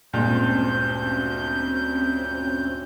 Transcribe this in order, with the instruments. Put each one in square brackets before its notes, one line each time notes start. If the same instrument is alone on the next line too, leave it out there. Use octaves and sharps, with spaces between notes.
[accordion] D2 G6 [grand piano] G2 A#2 G#3 [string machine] C4 C#4